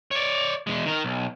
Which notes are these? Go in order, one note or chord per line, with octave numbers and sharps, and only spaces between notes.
C#5 D5
E2 G#3
D#3 A#4
B1